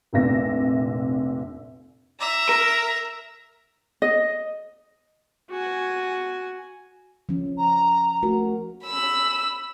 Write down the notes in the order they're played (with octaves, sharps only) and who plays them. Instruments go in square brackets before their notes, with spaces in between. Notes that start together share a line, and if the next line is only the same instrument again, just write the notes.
[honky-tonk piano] F1 A#1 C3 E5 A#6
[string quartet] E5 A#5
[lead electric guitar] A#4
[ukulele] D#5
[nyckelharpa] F#4 G#5
[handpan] F3 C#4
[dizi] A#5
[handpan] A3 F#4 A#4
[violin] B5 E6